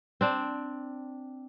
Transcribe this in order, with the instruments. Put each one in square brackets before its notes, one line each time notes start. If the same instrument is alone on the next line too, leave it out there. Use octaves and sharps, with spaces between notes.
[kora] C4 D4